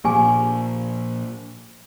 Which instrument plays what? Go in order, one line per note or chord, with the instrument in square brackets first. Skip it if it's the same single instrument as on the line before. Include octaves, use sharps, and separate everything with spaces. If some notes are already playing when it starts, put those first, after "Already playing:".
[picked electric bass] A#2 F3 A#3 [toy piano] G4 G#4 G#5